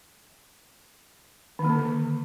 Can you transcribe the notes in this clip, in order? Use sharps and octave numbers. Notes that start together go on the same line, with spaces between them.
D#3
A#3
D3